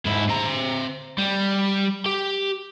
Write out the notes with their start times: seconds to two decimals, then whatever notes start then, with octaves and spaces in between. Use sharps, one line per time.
0.06 G#2 E4
0.30 C4 A#5
1.18 G3
2.06 G4